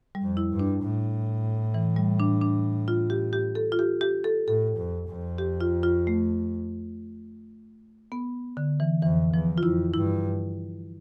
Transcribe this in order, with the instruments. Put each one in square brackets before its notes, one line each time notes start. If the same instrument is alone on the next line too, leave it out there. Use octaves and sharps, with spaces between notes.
[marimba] G3
[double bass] F2
[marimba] E4
[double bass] G2
[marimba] D4
[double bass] A2
[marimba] E3
G3
D4
D4
F4
G4
G4
A4
F4
G4
G4
A4
[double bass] A2 [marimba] A4
[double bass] F2
F2
[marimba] G4
F4
F4
A3
B3
D3
E3
[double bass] F2 [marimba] E3
[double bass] E2 [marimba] F3
[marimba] F4
[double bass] F2 [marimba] E4
[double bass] G2 [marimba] E4